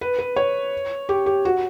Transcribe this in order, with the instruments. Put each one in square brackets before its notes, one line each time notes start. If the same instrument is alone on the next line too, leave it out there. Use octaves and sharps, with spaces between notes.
[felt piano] B4
B4
C#5
G4
G4
F#4